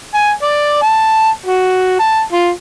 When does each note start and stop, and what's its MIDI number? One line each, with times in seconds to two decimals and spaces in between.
0.14 0.31 80
0.43 0.79 74
0.82 1.29 81
1.46 1.99 66
1.99 2.21 81
2.32 2.50 65